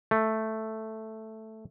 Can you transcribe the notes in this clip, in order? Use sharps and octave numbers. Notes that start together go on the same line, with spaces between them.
A3